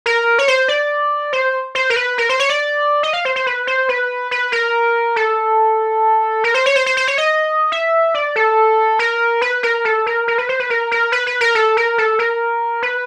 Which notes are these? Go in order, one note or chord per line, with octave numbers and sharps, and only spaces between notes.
A#4
C#5
C5
D5
C5
C5
A#4
B4
A#4
C5
C#5
D5
D#5
F5
C5
C5
B4
C5
B4
B4
A#4
A4
A#4
C5
C#5
C5
C5
C5
C#5
D#5
E5
D5
A4
A#4
B4
A#4
A4
A#4
A#4
B4
C5
B4
A#4
A#4
B4
B4
A#4
A4
A#4
A4
A#4
B4